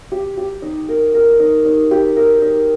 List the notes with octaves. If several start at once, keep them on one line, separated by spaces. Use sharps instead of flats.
G4
G4
D#4
A#4
A#4
D#4
D#4
G4
A#4
D#4